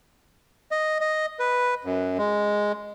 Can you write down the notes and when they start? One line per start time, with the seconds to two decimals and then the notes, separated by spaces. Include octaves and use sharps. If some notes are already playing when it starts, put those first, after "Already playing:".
0.71 D#5
1.01 D#5
1.39 B4
1.84 F#2
2.18 G#3